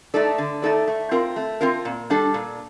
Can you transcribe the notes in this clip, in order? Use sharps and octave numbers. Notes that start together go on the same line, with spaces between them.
A3 D#4 A4 D5
D3
A3 D#4 A4 D5
A3
C4 F4 A#4
A3
C4 F4 A#4
A#2
G3 D4 A4
A#2